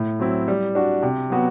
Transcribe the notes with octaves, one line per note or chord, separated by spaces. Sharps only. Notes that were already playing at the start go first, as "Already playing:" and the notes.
Already playing: A2
F#3 C4 E4
G3
D4 F#4
C3
F#3 B3 F#4